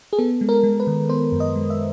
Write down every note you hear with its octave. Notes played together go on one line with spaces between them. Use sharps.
G#4
B3 A4
G#3
A#4
G#3
B4
D#3
B3 C5
F#2
D#5
G#3
E5